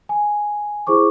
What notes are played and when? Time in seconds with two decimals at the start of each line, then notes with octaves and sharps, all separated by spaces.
0.09 G#5
0.87 E4 G#4 C5 C#6 D6